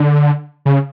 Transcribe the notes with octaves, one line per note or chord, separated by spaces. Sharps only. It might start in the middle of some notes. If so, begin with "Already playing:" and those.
Already playing: D3
C#3